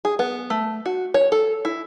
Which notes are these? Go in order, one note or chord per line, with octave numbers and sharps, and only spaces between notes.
G#4
B3
A3
F#4
C#5
A4
E4